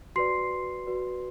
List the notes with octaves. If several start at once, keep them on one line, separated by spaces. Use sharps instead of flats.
F#4 B4 D5 C6 C7
F#4 B4 D5